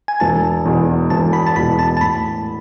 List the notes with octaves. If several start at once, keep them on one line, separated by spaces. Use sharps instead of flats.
G#5
E1 A5
E2 B2 G#3
E1 A5
B5
A5
E2 B2 G#3 B5
A5
A5
A2 B5